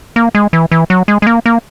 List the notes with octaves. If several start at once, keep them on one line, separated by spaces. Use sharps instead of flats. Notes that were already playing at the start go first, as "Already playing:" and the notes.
A#3
G#3
E3
E3
F#3
G#3
G#3
A#3
A#3